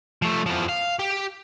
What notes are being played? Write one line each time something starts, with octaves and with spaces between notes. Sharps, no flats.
F3 A3
E2 F3
F5
G4